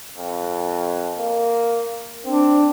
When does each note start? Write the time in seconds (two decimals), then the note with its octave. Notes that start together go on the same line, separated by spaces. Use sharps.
0.18 F2
1.18 A#3
2.25 C4 D4